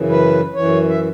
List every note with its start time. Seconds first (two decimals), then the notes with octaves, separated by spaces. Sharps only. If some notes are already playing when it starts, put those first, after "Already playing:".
Already playing: F#2 C#3 E3
0.09 B4
0.54 F#2 E3 C#5
0.89 E5